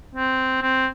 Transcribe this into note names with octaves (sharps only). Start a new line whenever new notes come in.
C4
C4